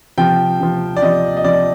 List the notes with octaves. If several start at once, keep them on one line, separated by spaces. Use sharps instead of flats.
C3 F3 G5
C3 F3
D5
C3 F3 D#5
D#5
C3 F3 D5